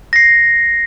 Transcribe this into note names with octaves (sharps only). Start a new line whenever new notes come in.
A#6 C7